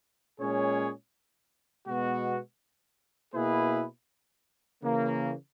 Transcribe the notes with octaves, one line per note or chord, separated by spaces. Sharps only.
A#2 G#3 C#4 G#4 C#5
B2 G#3 B3 F#4
B2 A#3 E4 G#4 B4
C#3 E3 A#3